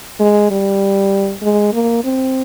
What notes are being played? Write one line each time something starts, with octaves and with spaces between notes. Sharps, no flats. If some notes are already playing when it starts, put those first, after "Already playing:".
G#3
G3
G#3
A#3
C4